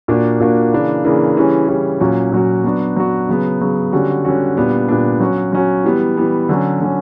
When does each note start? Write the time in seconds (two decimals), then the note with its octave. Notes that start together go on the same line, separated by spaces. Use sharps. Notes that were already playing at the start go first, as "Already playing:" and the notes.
0.08 A#2 A#3 D4 F#4
0.40 A#2 A#3 D4 F#4
0.72 C#3 E3 A#3 D4
1.04 C#3 E3 A#3 D4
1.36 C#3 E3 G3 C#4
1.68 C#3 E3 G3 C#4
2.00 A#2 F#3 C#4 F#4
2.32 A#2 F#3 C#4 F#4
2.64 F#3 B3 D4 F#4
2.96 F#3 B3 D4 F#4
3.28 C#3 F#3 B3
3.60 C#3 F#3 B3
3.92 D3 G3 C#4 F#4
4.25 D3 G3 C#4 F#4
4.57 A#2 G3 B3 D4
4.89 A#2 G3 B3 D4
5.20 F#3 C#4 F#4
5.53 F#3 C#4 F#4
5.84 E3 G3 B3
6.17 E3 G3 B3
6.49 D3 F#3 C#4
6.81 D3 F#3 C#4